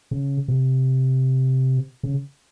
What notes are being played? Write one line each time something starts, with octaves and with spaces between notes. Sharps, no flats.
C#3
C3
C#3